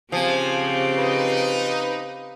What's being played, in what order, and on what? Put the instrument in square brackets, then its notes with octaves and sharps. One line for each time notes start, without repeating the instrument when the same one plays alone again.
[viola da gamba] C#3 C4 G4 [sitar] F3 [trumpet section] G#5
[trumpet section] D#4 [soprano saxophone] B4